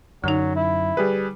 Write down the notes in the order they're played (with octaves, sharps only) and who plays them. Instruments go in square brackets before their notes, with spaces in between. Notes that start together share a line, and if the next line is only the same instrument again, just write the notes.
[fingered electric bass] F#2 [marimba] D3 D#4 [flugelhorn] F#3
[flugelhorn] E4
[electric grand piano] G3 G#4 B4